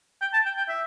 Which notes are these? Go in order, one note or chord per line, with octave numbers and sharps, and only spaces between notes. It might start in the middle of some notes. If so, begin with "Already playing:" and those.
G5
A5
G5
G5
E5